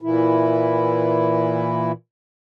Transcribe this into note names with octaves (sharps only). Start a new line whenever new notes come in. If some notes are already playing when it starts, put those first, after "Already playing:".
A#2 E3 E4